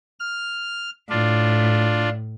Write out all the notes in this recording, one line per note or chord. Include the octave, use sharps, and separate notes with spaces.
F6
A2 D4 F4